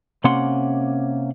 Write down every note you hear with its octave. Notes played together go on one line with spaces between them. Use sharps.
C3 A#3 C#4 G4 F#5 C6